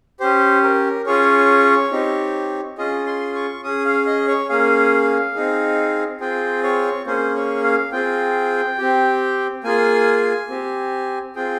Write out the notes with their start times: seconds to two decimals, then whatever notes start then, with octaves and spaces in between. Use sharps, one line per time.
0.20 C#4 G4 C5
0.63 A#4
1.06 C#4 F4 G#4 C#5
1.91 C4 D#4 G4
2.78 C#4 F4 G#4 D#5
3.06 C6
3.35 C#6
3.63 C#4 G#4 D#6
3.85 F5
4.06 D#5
4.28 C#5
4.49 A#3 C#4 G#4 F5
5.35 C4 D#4 G#4
6.21 C4 F4 G#4 G5
6.64 C#5
7.07 A#3 C#4 G#4 C5
7.36 C#5
7.64 F5
7.92 C4 F4 G#4 G5
8.78 C4 G4
9.64 A#3 F4 G#4 G#5
10.50 C4 G4
11.36 C4 F4 G#4 G5